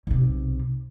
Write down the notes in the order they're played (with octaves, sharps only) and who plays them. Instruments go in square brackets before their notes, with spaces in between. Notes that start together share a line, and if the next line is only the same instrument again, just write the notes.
[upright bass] B1 C3